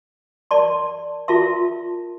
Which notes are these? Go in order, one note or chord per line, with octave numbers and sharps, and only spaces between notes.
A#4 D5 A5 C6
F4 A#4 E5 A5 C6